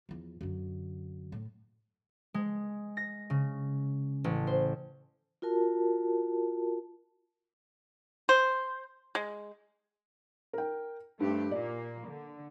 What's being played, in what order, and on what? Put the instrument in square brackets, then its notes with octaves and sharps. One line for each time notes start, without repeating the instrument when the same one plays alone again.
[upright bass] E2 F3
F#2 D3
A2
[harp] G#3
A#6
C#3
A1
C5
[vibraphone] F4 F#4 A#4 A5
[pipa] C5
G#3
[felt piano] A#4 G5
[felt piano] G2 [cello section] A3 C4 G4
[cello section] A#2 A#3 [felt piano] D5
[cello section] D3